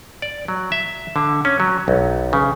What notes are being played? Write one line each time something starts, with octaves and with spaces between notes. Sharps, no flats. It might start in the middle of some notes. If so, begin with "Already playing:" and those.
D5
F#3
E5
D3
C#4
F#3
B1
C#3